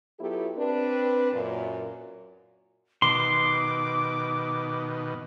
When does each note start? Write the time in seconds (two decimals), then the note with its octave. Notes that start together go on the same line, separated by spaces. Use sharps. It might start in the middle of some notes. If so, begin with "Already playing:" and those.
0.19 F#3 B3 E4 F4 G4 A4
0.57 C4 D4 B4
1.32 F#2 A#2
3.02 B2 D#3 C6 D6